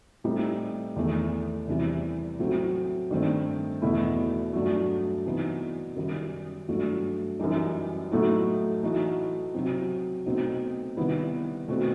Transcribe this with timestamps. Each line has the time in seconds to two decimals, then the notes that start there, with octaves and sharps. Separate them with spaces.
0.24 A2 G3 C4 D#4
0.96 E2 D#3 A3 E4
1.67 E2 C3 E3 G3
2.39 A2 F#3 A3 C4
3.11 G2 D#3 A3 C4
3.82 E2 B2 A3 E4
4.53 G2 F#3 A3
5.25 C3 E3 B3 D#4 F#4
5.96 F#2 D#3 G3
6.68 G2 F#3 A3
7.40 F#2 E3 G3 D#4
8.11 A2 F#3 A3 D#4 F#4
8.82 E3 A3 D#4 F#4
9.54 C3 F#3 C4
10.26 B2 A3 C4 D#4 F#4
10.97 C3 D#3 G3 B3 E4
11.68 B2 A3 C4 F#4